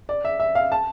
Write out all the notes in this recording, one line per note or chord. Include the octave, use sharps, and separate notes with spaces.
D5
E5
E5
F5
A5